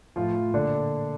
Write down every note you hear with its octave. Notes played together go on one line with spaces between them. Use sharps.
A2 F3 F4
F3
A#2 D3 D4